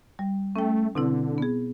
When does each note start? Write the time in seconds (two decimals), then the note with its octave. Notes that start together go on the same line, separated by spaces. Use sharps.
0.19 G3
0.56 A3 C#4 G5
0.95 B2 D3 C4 E4
1.38 B3 G#4